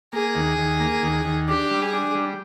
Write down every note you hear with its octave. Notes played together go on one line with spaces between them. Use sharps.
A#3 G#4
D#2
D#2
A#3
D#2
D#2
D4 G4
G3
G#4
D4
G3